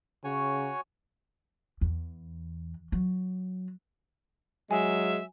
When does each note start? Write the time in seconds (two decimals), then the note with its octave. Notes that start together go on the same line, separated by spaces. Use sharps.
0.24 C#3 F#4 C#5 G#5
1.81 E2
2.92 F#3
4.71 F#3 G#3 E5 G#5